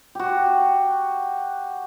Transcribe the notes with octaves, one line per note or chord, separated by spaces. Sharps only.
F#4 G4